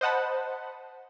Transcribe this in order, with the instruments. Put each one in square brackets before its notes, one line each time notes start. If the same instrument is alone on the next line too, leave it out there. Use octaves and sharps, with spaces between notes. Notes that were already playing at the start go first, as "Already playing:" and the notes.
[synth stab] C5 D#5 F#5 A5 B5